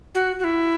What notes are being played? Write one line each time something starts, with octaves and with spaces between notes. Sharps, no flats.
F#4
F#4
E4